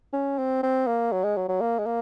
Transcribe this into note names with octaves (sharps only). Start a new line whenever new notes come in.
C#4
C4
C4
A#3
F#3
G#3
F#3
F#3
A#3
G#3
A#3